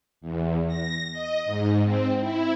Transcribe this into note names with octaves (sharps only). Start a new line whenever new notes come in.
E2
A#6
D#5
G#2
C4
E4